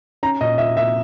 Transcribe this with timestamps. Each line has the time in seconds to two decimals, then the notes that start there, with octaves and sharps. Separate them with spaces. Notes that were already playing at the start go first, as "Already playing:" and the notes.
0.23 C#4 A#5
0.40 A#2 D#5
0.58 A#2 E5
0.77 A#2 E5